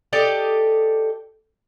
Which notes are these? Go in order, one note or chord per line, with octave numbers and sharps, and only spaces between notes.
G4 A4 D5 D#5